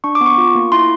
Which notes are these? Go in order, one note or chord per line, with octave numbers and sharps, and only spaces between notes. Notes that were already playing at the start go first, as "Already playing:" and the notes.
D4 C#6
D6
B3
C#6
F4
A#3
E4 C6